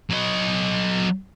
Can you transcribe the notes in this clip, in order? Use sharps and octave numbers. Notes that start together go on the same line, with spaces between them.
F#3 D#5